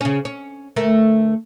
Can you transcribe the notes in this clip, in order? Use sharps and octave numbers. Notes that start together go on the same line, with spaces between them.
C#3 C#4
C#4
D2 A3 A#4